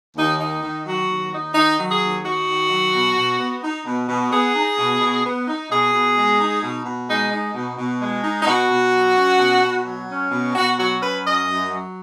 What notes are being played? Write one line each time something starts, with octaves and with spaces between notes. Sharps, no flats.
D#2 D#4
D#4
D#3
F#3 F#4
D#2
D#4
D#3 D#4
F#3
G#4
D#2
D#4 F#4
D#3
F#3
B2
B2
B3
D#4
B2
B2
B3 G#4
D#4
B2
B2
B3
D#4
B2 G#4
B2
G#3
D#4
B2
B2
G#3 D#4
D#4
B2
B2
G#3
D#4
D#4
B2 F#4
B2
F#3
C#4
B2
B2
F#3
C#4
B2
B2 F#4
F#3 F#4
C#4 B4
F#2 D#5
F#2
F#3